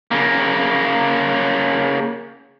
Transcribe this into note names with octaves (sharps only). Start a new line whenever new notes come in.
C#3 A#3